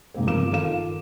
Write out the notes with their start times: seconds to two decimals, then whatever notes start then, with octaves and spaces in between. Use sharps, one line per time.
0.14 G#2 C3 A#3 C4
0.26 G1 F3 C4 A#4 D6 E7
0.51 D#3 F4 A4 A#4 F5 E7